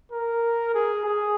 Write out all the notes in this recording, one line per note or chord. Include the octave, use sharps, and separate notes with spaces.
A#4
G#4
G#4